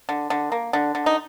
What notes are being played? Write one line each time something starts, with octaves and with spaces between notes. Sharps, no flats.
D3
D3
A#3
D3
D3
D#4